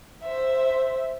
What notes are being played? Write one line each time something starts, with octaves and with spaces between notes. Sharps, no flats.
C5 E5